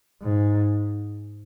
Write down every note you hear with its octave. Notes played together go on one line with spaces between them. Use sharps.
G#2